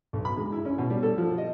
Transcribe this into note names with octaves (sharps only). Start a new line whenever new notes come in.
B1
B5
G#3
E4
C#4
B2
G3
A4
F3
D#5